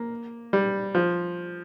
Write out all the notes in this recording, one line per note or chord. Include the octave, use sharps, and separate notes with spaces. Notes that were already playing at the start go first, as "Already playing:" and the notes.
Already playing: A#3
G3
F3